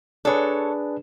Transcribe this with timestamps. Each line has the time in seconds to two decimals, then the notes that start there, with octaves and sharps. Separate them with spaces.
0.25 D4 G#4 A4 B4 C#5